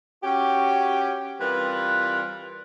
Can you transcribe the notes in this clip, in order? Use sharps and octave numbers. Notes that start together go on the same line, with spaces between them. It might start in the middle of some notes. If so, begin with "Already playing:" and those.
C#4 F#4 G4
E3 G3 C4 F4 A#4 B4